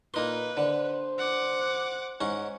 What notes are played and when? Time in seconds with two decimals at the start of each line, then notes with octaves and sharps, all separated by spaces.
0.14 A#2 A#3 D#4 B4 C6
0.57 D3 C5
1.18 F#5 D6
2.21 G#2 C#4 F#5